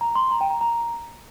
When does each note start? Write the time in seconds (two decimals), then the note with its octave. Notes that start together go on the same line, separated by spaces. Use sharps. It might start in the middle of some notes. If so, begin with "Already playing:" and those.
0.01 A#5
0.15 C6
0.31 A#5
0.41 G5
0.50 A#5
0.61 A#5